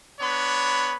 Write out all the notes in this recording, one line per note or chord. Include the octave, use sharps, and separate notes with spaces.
B3 D4 C#5 B5